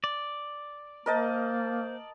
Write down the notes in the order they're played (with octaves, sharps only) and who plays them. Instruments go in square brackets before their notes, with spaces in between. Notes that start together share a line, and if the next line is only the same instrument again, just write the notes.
[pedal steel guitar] D5
[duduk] A#3 [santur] A#4 D#5 A5 [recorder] C5